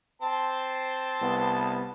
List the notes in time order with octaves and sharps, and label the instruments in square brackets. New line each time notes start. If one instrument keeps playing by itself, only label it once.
[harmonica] C4 C5 A5
[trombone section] C2 B3